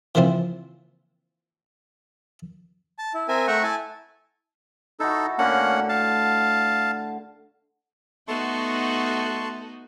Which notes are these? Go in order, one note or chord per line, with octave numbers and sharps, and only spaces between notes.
A#2 C#3 E3 F3 C4
A5
E4
C4 A#4 E5 G#5
A3 E5 F#5 G5 A#5 C#6
E4 G#5 A5
D#4 E4 F#4 A4
A2 D3 A#3 C#4 F#5
F5 A5
A3 B3 D#4 F#4 A5 C6 C#6